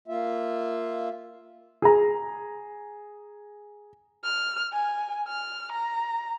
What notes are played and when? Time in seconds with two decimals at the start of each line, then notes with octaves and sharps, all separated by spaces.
0.08 A#3 F4 E5
1.82 G#4 A#5
4.23 F6
4.73 G#5
5.28 F6
5.72 A#5